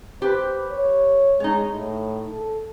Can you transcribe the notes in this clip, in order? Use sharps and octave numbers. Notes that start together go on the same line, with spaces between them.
G4 B4 C5
C#5
G#3 D#4 C#5
A2
A4